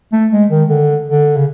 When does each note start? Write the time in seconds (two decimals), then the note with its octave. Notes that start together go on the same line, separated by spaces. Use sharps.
0.12 A3
0.32 G#3
0.50 D#3
0.69 D3
1.08 D3
1.36 C#3